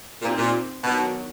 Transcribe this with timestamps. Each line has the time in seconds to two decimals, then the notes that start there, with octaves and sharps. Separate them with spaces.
0.22 A#2 C4 D#4 G4 C5
0.37 A#2
0.84 B2 D#3 F#3 B3 D4 F#4